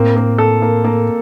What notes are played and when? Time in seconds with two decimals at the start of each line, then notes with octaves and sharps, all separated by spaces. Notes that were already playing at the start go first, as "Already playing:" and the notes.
Already playing: A2 A#3 C4
0.16 A#3
0.38 A4
0.62 A#3
0.84 A#3